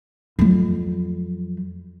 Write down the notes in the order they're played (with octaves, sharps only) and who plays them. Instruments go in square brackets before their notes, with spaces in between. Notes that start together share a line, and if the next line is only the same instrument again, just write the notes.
[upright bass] F2 F#3